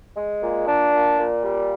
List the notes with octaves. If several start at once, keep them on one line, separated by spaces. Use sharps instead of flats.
G#3
A#2
D4
A#2
A#2
G3